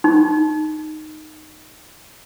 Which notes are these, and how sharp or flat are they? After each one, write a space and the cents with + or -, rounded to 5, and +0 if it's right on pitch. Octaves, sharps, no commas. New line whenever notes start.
D#4 -10